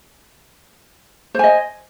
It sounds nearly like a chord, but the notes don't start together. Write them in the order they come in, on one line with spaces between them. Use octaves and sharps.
C5 G#5 D#5